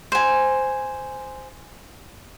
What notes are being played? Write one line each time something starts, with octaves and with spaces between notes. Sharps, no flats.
C5 G#5